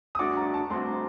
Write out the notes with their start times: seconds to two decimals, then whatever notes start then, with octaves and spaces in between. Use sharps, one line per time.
0.15 D#6
0.19 G2 D3 A3 D4 F#4 D6
0.37 A#5
0.54 A5
0.70 G2 D3 A3 C4 F#4 C6